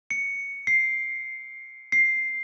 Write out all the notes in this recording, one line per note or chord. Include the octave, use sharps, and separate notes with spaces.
C#7
C7
C7